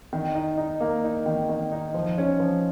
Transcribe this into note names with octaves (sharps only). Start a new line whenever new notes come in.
D#3
D#4
D#4
A#3
D#4
D#3
D#3
D#4
F3
C#4
F3